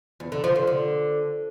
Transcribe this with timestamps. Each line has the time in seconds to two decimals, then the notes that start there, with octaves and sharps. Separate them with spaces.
0.20 E2
0.32 D3
0.44 F3
0.56 D3
0.67 D3